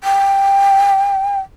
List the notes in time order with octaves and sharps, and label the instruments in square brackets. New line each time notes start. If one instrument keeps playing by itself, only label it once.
[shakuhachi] G5